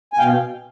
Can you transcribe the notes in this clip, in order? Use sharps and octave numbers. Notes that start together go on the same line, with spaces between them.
G#5
B2 F5 G5